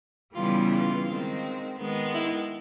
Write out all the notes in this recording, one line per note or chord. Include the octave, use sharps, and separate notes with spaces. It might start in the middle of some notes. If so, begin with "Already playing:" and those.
C#3 E3 G3 B3 F4
F4
D#3 G#3 C4
D#3 G#3 B3
E4